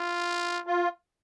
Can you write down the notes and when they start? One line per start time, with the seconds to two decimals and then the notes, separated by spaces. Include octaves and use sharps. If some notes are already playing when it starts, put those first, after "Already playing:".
Already playing: F4
0.67 F4